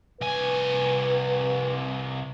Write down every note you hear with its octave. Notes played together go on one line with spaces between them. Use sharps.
C2 B4 G#5